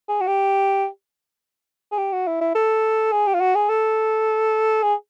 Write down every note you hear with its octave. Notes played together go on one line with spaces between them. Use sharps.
G#4
F#4
G4
G#4
G4
F#4
E4
E4
A4
G#4
G4
F4
F#4
G#4
A4
G#4